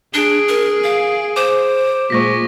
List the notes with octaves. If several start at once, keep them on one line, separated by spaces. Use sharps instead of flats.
D4 G#4 D7 G7
A#4
F5
C5 D6
A#2 G#3 C#6 A#6 B6